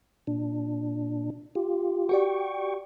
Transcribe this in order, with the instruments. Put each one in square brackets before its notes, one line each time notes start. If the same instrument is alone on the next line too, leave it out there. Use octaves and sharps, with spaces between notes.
[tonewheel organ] A#2 D4
F4 G4
[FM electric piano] F#4 G4 D5 [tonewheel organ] G5 C#6